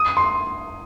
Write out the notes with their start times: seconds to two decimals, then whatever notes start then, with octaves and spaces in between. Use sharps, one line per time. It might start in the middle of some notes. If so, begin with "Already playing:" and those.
Already playing: D#6
0.17 C6